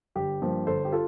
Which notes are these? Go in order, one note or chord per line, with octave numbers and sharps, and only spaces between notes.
G1 G4
G2 F3 A#3
G1 A4 C5
G4
F4 A4